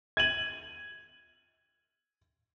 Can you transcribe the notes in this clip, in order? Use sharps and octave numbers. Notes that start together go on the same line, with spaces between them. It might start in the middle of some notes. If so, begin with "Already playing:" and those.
G#6 D#7 F#7